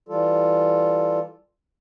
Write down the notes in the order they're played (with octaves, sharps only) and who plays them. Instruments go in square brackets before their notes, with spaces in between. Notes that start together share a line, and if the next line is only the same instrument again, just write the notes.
[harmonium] E3 G3 F4 A4